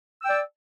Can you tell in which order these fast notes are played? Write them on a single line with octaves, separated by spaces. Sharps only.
E6 G5 D5